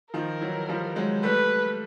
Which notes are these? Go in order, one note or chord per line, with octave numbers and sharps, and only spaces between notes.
D#3 F3 A#4
E3 F#3
F3 G3
F#3 G#3
G3 A3 B4